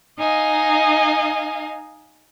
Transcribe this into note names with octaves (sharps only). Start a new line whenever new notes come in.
D#4 D#5 F5 G#5